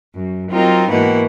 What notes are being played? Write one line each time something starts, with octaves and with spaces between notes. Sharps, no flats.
F#2
F#3 C4 D#4 F4 A#4
G#2 B2 E3 A#3 F#5